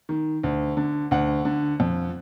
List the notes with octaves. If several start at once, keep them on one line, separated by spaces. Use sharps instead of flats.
D#3
D2
D3
D2 F#5
D3
F2